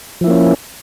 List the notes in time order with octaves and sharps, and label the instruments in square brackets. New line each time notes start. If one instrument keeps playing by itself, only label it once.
[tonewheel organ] F3
E4
A#3
C#4